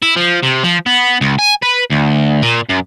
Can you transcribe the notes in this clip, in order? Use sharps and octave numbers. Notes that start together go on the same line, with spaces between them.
E4
F3
C3
F3
B3
C#2
G#5
B4
D2
A#2
F#2